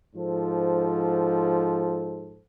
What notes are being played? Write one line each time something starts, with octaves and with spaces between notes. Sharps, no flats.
G#2 F3 A4 C5